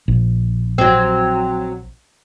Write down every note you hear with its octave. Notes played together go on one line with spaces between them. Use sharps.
A#1
F#3 C4